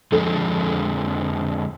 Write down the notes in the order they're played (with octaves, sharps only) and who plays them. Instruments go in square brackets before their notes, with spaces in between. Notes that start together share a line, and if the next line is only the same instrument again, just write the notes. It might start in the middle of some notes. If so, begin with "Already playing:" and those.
[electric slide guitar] F2 D3 F3 G#3 [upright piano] A4